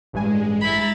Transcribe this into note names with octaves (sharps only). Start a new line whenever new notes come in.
A1 G2 G#3 G#5
E4 A#5 B5 A6